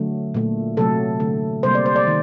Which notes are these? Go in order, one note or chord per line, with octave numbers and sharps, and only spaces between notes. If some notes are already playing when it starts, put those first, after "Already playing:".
Already playing: D3 F#3 A3
A#2 A3
C3 F#3 A3 A4
D3 A3
C3 G3 A#3 C5
D5
C5
D5
D#3